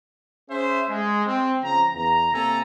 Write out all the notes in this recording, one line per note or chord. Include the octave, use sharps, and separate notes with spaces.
C#4 G#4 C5 E5
G#3
C4
C#3 F3 A#5
E2 A#5
C3 A#3 A4 G#5 A#5